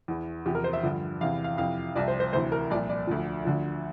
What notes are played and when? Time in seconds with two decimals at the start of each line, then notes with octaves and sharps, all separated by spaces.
0.08 E2 E3
0.46 E2 C3 F3 G4
0.55 A#4
0.64 C5
0.73 E5
0.83 G2 D3 F3
1.21 E2 C3 E3 F5
1.44 F5
1.57 F2 C3 E3 F5
1.95 C2 C3 F3 D5
2.08 C5
2.20 C5
2.32 D2 C3 E3 C5
2.52 A#4
2.70 C2 A#2 F3 D5
2.89 D5
3.07 D2 D3 F3
3.45 D2 D3 F3